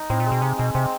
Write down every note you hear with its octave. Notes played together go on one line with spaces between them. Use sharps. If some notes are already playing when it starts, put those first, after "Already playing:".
Already playing: D#4
A2 C4
A#2
G#3
B2
C3 D#4
B2 G#3
C3 C4